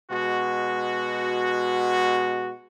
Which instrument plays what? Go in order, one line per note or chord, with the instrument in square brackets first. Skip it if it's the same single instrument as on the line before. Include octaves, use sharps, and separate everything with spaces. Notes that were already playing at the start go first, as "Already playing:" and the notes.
[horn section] B2 G#3 F#4